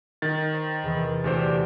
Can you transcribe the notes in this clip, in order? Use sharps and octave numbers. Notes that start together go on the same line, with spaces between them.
D#3 A6
C5
E2 C3 E3
D2 A3 F#4 G4 C5 D5